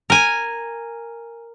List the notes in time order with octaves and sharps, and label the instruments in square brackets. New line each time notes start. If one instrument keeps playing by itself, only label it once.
[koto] A#4 G#5